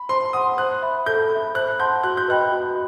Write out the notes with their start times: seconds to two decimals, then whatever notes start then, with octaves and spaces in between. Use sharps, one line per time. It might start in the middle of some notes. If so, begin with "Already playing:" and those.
Already playing: B5
0.09 C5 C6
0.33 F#5 C6 D#6
0.57 C5 F#6
0.82 E5 B5
1.06 A4 G6
1.31 E5 B5
1.55 C5 F#6
1.79 F#5 A5 C6 G6
2.03 F#4 F#6
2.17 G6
2.28 B4 D#5 G5 B5 F#6
2.52 F#4